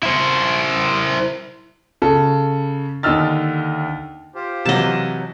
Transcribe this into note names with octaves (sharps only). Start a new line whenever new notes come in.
E4 C5
C#3 A4
D#2 D3 D#5 E6 F6 A6
F4 G4 C5
C3 E3 F#3 D#5 A5